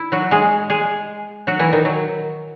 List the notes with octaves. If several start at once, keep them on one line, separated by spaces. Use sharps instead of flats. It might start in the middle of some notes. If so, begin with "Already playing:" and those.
Already playing: E4
F#3 F#4
G#3 G#4
G#3 G#4
F#3 F#4
E3 E4
D#3 D#4
F#3